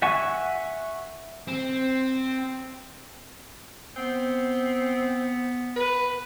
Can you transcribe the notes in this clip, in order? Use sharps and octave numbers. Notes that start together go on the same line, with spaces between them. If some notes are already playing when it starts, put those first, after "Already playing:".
E5 F#5 G#5 C#6
C4
B3 C4
B4